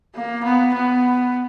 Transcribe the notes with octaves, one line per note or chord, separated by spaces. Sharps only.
A#3
B3
B3